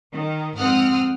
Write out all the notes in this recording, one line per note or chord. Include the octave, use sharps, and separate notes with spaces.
D#3
F2 G#2 C4 F#5 D#6 F6